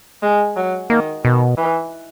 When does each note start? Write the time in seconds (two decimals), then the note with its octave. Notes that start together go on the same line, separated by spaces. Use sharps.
0.22 G#3
0.56 F#3
0.90 D#3 A#3
1.24 B2 D#3
1.57 E3